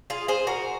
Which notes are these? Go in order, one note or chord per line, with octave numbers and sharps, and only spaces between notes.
F4 G#4
G#4 C5
F#4 A#4